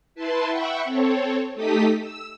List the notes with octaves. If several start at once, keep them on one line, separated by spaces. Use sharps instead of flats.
E4 B4 A5 C6
E5 F#5 G5 B5 C#6
C4 A4 C#5
A3 D#4 G4 A4 D#6 B6
E6